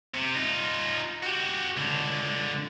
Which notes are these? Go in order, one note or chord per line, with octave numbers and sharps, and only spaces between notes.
C3
D#4 F4
F#4 G4
C#2 D3